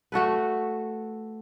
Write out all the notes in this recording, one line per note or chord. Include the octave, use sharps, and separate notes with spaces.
A3 F#4 A4 B4